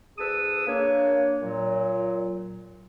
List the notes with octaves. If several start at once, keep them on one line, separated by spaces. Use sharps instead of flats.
D2 G#4 B4 A5 D#6 E6
A#3 D4 C#5
A#2 F#3